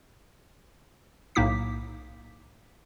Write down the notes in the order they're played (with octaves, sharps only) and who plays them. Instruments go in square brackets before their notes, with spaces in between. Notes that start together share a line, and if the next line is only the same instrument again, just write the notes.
[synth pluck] B1 A2 A#3 D#4 D6 B6